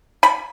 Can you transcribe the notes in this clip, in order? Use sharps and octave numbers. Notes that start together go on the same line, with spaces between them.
B5